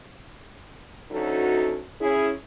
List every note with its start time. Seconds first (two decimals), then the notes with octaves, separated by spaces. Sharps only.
1.11 D2 F#3 C#4 D#4 F#4 A4
2.01 C#4 E4 G#4